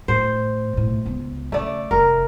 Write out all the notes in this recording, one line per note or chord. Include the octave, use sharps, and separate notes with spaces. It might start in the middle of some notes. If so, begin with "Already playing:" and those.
A2 C5
B1 A2
C#2 B3
C#3 A3 D5
F1 A#4